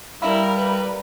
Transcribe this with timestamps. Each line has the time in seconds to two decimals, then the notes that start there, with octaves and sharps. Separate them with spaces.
0.22 G3 E4 A#4 F5 B5
0.56 B4